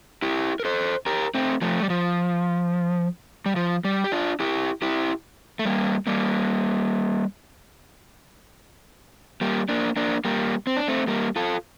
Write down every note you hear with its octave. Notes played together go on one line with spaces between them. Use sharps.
E4 G4
A#4
A4 C5
G4 A#4
A3 C4
F3 A3
G3
F3
G3
F3
G3
G4
D4 F4
E4 G4
E4 G4
A3
G3 A#3
G3 A#3
G3 A#3
A#3 D4
A#3 D4
G3 A#3
C4
D4
A3 C4
G3 A#3
F4 A4